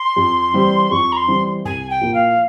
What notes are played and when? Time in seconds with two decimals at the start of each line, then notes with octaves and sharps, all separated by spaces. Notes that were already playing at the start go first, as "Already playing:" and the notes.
Already playing: C6
0.16 F2
0.53 E3 G3 C4 G4
0.91 F2 C#6
1.11 A#5
1.16 C6
1.28 E3 G3 C4 G4
1.65 C2 G#5
1.89 G5
2.01 A#2 F3 A#3 E4
2.14 F5